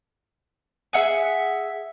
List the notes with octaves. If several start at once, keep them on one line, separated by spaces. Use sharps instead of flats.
G#4 E5 F#5 G#5